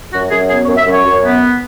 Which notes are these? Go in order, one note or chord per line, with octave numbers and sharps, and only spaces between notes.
F#2 F#4
F#2 G#4
B3 G#4
C#5
F#2
E5
F#2
C#5
F#2
B3